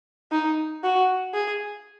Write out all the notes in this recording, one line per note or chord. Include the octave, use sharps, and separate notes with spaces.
D#4
F#4
G#4